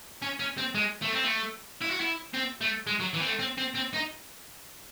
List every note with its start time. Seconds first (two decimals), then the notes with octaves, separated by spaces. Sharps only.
0.22 C#4
0.39 C#4
0.58 C4
0.75 G#3
1.02 A3
1.12 C4
1.24 A3
1.81 E4
1.90 F#4
2.00 E4
2.34 C4
2.61 A3
2.87 G#3
3.00 F#3
3.14 E3
3.20 C4
3.26 A3
3.39 C4
3.57 C4
3.74 C4
3.93 D#4